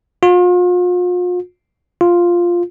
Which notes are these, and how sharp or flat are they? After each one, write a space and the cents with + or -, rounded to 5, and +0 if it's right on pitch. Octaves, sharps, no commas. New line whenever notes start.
F4 +40
F4 +0